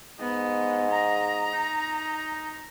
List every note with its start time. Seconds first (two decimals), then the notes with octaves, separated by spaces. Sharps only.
0.20 G#2 B3 D#5
0.91 A#5
1.53 D#4